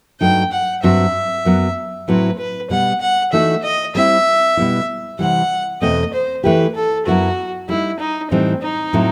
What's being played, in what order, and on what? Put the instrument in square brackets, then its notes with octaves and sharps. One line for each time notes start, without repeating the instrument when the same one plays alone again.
[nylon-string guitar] G2 F#3 A3 D#4 [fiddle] G5
[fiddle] F#5
[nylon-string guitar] G2 F#3 C4 F#4 [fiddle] E5
[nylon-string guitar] F#2 F#3 B3
[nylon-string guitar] A2 F#3 C4 E4 [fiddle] B4
[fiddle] B4
[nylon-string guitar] B2 G3 B3 [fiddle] F#5
[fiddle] F#5
[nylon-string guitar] E3 A3 D#4 F#4 [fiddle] E5
[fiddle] D#5
[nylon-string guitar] G3 C4 E4 [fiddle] E5
[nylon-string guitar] B2 G3 B3 E4
[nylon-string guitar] C3 E3 G3 [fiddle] F#5
[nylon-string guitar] E2 B2 A3 C4 [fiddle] D#5
[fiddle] C5
[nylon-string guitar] E3 A3 E4 G4 [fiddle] B4
[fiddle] A4
[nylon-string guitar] F#2 F#3 B3 E4 B4 [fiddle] F#4
[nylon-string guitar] G3 B3 D#4 [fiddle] E4
[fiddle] D#4
[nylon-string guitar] A2 E3 G3 D#4 [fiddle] C4
[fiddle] D#4
[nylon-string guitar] A2 F#3 C4 E4